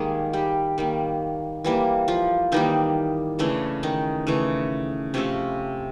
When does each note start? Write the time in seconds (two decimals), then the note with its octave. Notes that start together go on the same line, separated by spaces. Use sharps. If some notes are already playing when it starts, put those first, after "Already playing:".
Already playing: D#3 G3 G#3 A#3 G#4
0.33 G3 G4
0.78 D#3 G3 A#3
1.64 E3 G3 A#3
2.08 F3 F4
2.52 D#3 E3 G3 A#3 D#4
3.39 C#3 E3 A3 D4
3.83 D#3 D#4
4.27 C#3 E3 A3
5.14 C3 F3 A3 C4 C#4